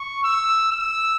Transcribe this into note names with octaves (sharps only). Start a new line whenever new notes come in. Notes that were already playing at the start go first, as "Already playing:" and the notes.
Already playing: C#6
E6
E6